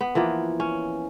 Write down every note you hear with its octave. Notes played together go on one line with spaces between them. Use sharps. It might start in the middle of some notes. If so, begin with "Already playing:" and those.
B3
E3 F3 A#3 B3
C#4